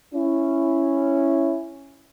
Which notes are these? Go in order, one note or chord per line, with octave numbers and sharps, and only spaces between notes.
C#4 E4